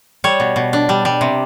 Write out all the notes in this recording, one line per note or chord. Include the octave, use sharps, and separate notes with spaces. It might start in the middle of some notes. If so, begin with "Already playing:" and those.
G3 C#5
B2
B2
D4
G3
G3
C3